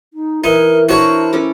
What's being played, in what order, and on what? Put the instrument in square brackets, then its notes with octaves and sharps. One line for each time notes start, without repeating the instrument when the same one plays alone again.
[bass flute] D#4
[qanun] E3 [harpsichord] D#4 [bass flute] A#4
[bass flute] D4 [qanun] E4 A#4 C5 [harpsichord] F#4 C#5
[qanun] C#4 A4 D6